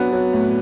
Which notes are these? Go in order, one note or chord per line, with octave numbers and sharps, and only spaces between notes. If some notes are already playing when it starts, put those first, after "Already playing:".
Already playing: F#3 B3 D4
F#3
A2